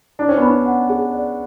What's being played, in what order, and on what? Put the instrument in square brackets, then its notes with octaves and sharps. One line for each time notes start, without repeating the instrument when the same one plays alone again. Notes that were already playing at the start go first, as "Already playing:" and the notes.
[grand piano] D4 [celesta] D5
[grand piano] C#4
[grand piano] B3 [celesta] B5
[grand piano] C#4
[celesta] F#5
G#4
D5